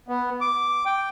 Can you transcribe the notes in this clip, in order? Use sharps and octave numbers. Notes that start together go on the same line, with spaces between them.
B3
D6
G5